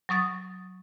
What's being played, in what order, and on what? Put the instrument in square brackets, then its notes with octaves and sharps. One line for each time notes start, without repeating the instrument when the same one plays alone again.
[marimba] F#3 C#6 D#6 A6